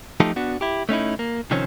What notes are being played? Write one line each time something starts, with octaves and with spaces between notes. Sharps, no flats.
F3 A3 D#4 F4 G4 A4
B3 D4 F#4
E4 G4
A3 C#4 D#4 E4
A#3
C3 D#3 F3 C4 C#4